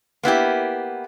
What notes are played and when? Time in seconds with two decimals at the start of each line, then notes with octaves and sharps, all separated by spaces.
0.23 A#3 B3 E4 G4